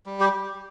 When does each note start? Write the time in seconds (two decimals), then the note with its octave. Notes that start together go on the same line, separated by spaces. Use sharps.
0.06 G3
0.20 G4